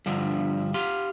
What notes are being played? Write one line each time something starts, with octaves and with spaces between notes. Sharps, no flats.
G2 D3 F3
G4 F5 C6